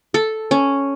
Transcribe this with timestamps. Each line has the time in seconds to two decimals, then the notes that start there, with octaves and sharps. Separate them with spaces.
0.14 A4
0.51 C#4